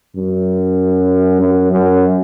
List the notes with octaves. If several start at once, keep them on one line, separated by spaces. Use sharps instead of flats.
F#2
F#2
F#2